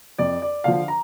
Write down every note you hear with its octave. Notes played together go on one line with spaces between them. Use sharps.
F2 D5
D5
D3 F3 F5
A#5